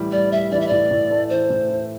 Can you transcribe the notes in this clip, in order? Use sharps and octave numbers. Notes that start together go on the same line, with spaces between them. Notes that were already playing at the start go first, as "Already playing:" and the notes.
Already playing: A2 E3 G3
G3 D5
G3 E5
E3 D5
E5
A2 D5
A2
A3
E3 C5
A2
E3